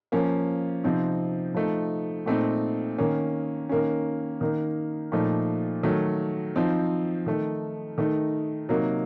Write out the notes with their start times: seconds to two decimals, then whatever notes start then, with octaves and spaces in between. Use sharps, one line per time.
0.12 F3 A#3 C#4
0.84 C3 F3 C4 D#4
1.54 F3 A3 D#4
2.26 A#2 A3 C4 D#4
2.98 D#3 A#3 C#4
3.69 D#3 A#3 C#4
4.41 D#3 A#3 D#4
5.12 A#2 F3 A3 D#4
5.83 D#3 F#3 A3
6.56 F3 C4 D#4
7.26 D#3 A3 D#4
7.98 D#3 A3 D#4
8.69 C3 F#3 A#3 D#4